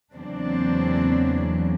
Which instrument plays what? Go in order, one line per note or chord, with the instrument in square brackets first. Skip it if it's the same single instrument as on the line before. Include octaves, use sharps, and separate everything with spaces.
[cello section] E2 C#3 F#3 A#3 C4 D4